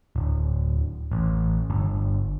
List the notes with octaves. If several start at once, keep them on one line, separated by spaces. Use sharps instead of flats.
D1
A1
G1